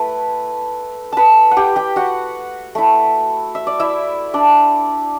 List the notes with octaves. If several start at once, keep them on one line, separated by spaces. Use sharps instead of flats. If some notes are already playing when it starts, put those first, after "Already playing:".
Already playing: A3 E4 B4
B4 A5 B5
F#5
G4 G5
G4 G5
F#4 F#5
A3 E4
E5
D5
E4 E5
D4 D5